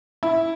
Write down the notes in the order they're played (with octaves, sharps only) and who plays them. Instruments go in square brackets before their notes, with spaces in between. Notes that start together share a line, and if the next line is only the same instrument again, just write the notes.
[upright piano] E4